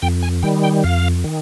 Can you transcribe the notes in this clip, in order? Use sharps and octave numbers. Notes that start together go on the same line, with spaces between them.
F2 G5
G#5
D#3 G3 G5
G5
F2 F5
D#3